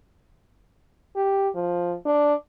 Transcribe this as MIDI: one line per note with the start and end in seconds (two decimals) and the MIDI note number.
1.16 1.49 67
1.55 1.95 53
2.06 2.34 62